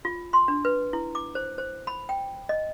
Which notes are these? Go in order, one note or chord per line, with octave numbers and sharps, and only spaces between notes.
F4
C6
D4
B4
E4
D6
C5
C5
B5
G5
D#5